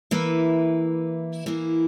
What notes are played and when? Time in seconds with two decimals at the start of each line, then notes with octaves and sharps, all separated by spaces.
0.11 E3 A#3 E4 B4 E5
1.46 E3 A#3 E4